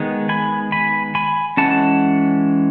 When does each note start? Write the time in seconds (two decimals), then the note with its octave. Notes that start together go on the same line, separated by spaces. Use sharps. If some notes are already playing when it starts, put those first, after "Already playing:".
Already playing: D#3 G#3 B3
0.29 G#5 B5
0.72 G#5 B5
1.15 G#5 B5
1.57 E3 G#3 C#4 F#5 A5